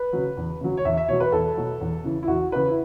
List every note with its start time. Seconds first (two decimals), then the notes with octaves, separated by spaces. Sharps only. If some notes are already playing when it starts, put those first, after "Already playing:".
Already playing: B4
0.13 C#3 F#3
0.37 E2
0.61 C#3 F#3
0.77 C#5
0.85 E2 E5
0.97 E5
1.08 B2 F#3 C#5
1.20 B4
1.32 E2 A4
1.57 B2 F#3
1.81 E2
2.04 C#3 E3
2.23 E4
2.28 E2 F#4
2.52 C#3 E3 B4
2.68 E4